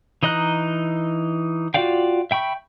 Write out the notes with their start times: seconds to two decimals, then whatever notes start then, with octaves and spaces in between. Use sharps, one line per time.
0.23 E3 D#4 D#5 A#5 F#6
1.74 F4 F#4 D5 F5 G5
2.31 E5 G5 B5 C#6